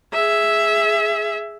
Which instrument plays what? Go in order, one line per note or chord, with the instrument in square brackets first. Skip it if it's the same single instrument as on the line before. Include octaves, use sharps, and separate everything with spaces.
[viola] G#4 E5